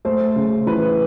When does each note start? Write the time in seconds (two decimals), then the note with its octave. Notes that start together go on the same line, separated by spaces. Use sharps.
0.05 A3 C5
0.36 C#3
0.67 E3 B4